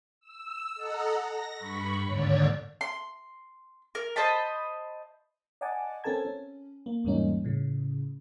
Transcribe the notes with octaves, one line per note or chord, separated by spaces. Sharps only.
E6
A4 D#5 F#5 A#5
A#6
G2 B5 C#6
D#2 G#2 D3 C#5 D5
C6
A#4
C5 D#5 A5 B5
D5 D#5 F#5 G#5 A5 D6
C4 C#4 A4 A#4 A5 G#6
C#4
A#3
E2 G#2 G3 A#3 C#4 D#4
A2 C#3